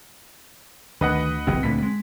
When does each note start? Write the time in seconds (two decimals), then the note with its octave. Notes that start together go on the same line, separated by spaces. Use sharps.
1.01 D2 D#3 B4 D#5 F#5
1.47 F#1 C2 E3 C4
1.63 D2 A#2 D3 B6
1.82 G#3